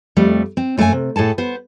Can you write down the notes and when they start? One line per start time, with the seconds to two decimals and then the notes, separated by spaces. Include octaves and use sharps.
0.16 F2 G3 A3
0.57 C4
0.77 F#2 A3 A#3 A#4 G#5
0.92 C3
1.16 A2 G#4 A4 A5
1.38 B3 C5